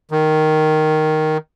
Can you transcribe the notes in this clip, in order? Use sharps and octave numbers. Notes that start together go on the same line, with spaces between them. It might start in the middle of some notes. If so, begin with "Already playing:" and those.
D#3